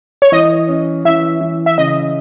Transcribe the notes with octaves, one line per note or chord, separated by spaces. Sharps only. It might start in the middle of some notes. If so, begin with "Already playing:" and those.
C#5
E3 D#5
C#4
E3 E5
E3
E5
C#3 D#5